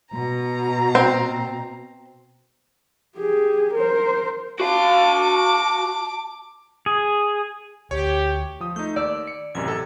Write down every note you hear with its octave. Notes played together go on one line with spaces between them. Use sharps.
B2 A#5
C4
G4 G#4
A#4 C5
F#4 F5 A5 D6
G#4
D2 G4 C#5
F3 D#6
A3 D#4 G6
D#2 D5 E6
C#7
A1 F#2 C3 G#6
C3 A4